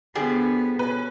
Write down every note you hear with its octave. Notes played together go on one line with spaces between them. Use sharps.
D3 F3 G3 B3 G#4 B4
B2 C#4 B4